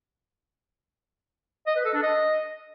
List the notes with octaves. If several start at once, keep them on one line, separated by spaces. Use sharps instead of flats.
D#5
B4
A4
D4
D#5